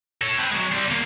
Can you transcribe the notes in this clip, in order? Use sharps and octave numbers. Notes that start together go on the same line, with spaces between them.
A4 C#5
C4 B4
F#3 G#3
G3 C4
E2 A#3